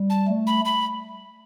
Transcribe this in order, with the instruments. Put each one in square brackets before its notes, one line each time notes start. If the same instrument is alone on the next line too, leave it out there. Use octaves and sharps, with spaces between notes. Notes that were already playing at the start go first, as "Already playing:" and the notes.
Already playing: [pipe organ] G3
[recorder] A5
[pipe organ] A3
[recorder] B5
B5